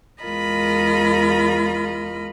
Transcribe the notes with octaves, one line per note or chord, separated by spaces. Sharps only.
E2 G#3 F4 A#4 D#5 B5